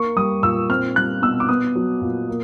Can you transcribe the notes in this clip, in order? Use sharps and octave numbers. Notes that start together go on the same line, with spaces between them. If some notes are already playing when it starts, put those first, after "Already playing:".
Already playing: A#3 C#6
G3 D#6
A#2 E6
C4 F6
G3 F#6
B2 E6
D6
B3 D#6
F#3
A#2
A#3